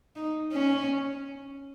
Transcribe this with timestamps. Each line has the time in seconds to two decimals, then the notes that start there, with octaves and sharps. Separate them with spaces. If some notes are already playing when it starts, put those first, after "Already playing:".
0.16 D#4
0.52 C#4